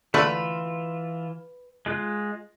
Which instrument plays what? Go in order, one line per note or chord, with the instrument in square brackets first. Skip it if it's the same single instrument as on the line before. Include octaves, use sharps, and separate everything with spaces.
[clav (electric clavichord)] D3 A3 [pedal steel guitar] E3 F4 [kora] B4
[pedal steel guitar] G#3 F4 F#6